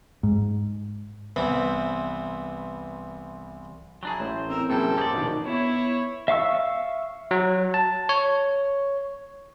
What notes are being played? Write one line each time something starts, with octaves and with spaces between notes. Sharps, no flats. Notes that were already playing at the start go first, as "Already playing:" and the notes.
G#2
C2 E3 B3 C4
F#3 D4 E4 G#4 G#5 A#5
A1 A2 C5
C4 A#4 E6
F#2 C3 A3 A#3 E4 G#4 A4 G5
A#3 C4 C#4 G4 D5 D#6
A#1 B2 D#3 D4
B3 E4 C#5
E5 F5 C#6 E6
F#3
A5
C#5